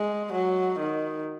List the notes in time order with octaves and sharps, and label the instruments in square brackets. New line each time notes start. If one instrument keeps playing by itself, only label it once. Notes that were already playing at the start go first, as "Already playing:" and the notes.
Already playing: [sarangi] G#3
F#3
D#3